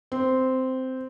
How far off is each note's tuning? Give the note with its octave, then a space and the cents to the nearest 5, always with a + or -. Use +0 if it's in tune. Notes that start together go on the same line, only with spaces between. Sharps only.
C4 -10